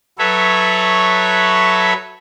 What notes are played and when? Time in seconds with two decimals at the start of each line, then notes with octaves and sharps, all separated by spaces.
0.19 F#3 A4 B4 C#5 E5